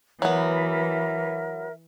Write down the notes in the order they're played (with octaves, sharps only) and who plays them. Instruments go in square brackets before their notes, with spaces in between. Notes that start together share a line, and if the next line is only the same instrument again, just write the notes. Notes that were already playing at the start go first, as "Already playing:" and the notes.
[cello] E3 [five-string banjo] F#3 B3 [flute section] A#4 E5